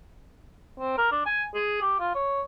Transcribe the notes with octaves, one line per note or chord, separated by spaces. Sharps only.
C4
A#4
D4
G#5
G#4
G4
F4
C#5